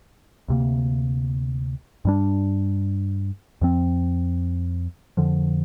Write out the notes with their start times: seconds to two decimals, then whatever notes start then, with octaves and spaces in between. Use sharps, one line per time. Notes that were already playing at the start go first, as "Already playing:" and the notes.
0.48 D2 C3 A#3
2.05 G2 G3 D4
3.61 F2 F3 C4
5.17 F2 D3 F3